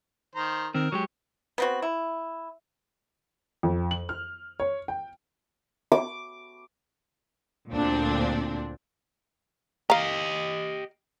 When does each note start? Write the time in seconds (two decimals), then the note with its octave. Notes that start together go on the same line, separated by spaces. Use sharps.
0.35 D#3 C5 A#5
0.74 D#3 C4 A#4
0.92 F#3 G#3 G4 C#6
1.58 B3 C4 F#4
1.82 E4
3.63 F2
3.91 F#7
4.09 F6
4.60 C#5
4.88 G5
5.92 D6
7.72 D2 A#2 C4 D4
9.90 G4 D#5 F5 A#5